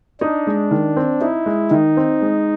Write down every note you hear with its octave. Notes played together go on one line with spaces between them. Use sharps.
D4 D#4
G#3
D#3
C4
D#4 E4
G#3
D#3 D#4
C4
G#3